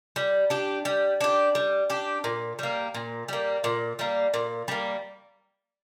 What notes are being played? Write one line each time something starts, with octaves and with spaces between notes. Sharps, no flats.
G3
D4 G4
G3
D4 G4
G3
D4 G4
A#2
G3 A#3
A#2
G3 A#3
A#2
G3 A#3
A#2
G3 A#3